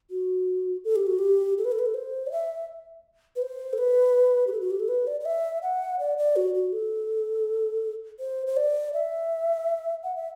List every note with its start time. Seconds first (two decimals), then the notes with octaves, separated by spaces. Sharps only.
0.11 F#4
0.85 A4
0.96 G4
1.07 F#4
1.19 G4
1.58 A4
1.65 B4
1.72 A4
1.79 B4
1.86 A4
1.94 C5
2.27 D5
2.32 E5
3.36 B4
3.42 C5
3.73 A4
3.78 B4
4.47 G4
4.52 A4
4.61 F#4
4.71 G4
4.80 A4
4.88 B4
5.07 D5
5.20 D5
5.25 E5
5.63 F#5
5.99 D5
6.18 D5
6.36 F#4
6.55 F#4
6.73 A4
8.20 C5
8.47 C5
8.57 D5
8.94 E5
10.04 F#5
10.16 E5